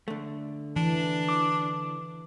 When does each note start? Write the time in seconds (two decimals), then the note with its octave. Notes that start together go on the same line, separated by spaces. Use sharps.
0.08 D3 A3
0.76 E3 D4
1.29 D6